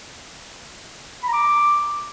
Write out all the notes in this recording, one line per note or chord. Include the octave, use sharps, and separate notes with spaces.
B5
A#5
D6